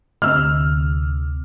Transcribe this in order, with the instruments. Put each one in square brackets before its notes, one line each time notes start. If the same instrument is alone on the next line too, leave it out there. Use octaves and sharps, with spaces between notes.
[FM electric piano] D2 C3 [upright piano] E6 F6